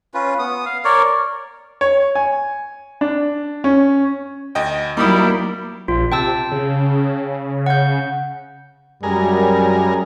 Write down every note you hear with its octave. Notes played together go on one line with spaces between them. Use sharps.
C#4 F4 B4
B3 D#6
F5
A#4 C#5 D5
C#5
G#5
D4
C#4
D2 D#5 G5
F#3 G3 A#3 D#4 E4 B5 D#6
A#1 F4
C3 G5 A5 E6
C#3
F#5 G6
F#2 G3 G#3 A#4